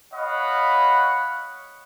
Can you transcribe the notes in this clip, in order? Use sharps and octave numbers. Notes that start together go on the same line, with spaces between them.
C#5 D#5 F5 F#5 B5